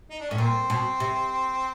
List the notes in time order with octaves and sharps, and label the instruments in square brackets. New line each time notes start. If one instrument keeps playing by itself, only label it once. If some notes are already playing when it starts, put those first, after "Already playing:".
[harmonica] D#4
D4
[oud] A2 [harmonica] C#4
[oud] A#2 [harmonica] C4
[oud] B2
C3